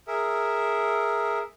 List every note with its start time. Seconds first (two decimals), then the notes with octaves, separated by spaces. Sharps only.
0.07 G#4 A#4 E5